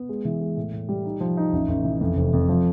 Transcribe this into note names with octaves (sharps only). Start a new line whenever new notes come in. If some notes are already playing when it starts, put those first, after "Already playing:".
Already playing: B3
G#3
E3
G#3
A2
A2
G3
D#4
F3
D#4
A1
A1
E3
F2
F1
F2
F3